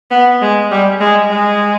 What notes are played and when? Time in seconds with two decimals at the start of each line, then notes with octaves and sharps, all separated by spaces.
0.11 B3
0.42 G#3
0.71 G3
1.00 G#3
1.30 G#3